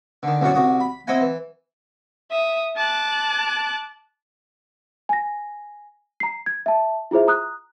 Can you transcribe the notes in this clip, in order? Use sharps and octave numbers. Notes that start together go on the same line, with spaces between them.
D3 D#3
C2 F#2 F#3 C#4 F#5 A5
C2 F#4 D#6
B5
C4 E4 D#5 F#5 G#5
E3
E5 D#6
A5 D6 F#6
G#5 A#6
A#5 C7
G#6
E5 A5
E4 F4 G#4 C5 E5
A#5 D#6 F#6